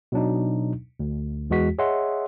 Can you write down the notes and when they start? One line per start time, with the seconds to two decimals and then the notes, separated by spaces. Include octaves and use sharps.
0.12 B2 F#3 D4 D#4
1.00 D2
1.50 E2 E3 G#3 F#4 B6
1.79 G#4 C#5 D#5 E5 F#5 C6